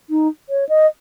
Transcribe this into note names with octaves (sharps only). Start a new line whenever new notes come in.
D#4
C#5
D#5